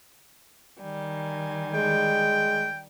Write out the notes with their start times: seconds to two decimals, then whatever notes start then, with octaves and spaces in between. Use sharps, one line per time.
0.82 D#3 G3 G#5
1.75 G#3 G5